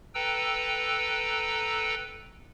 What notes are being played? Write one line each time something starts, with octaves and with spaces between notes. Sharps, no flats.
A4 B4 G5 A#5 E6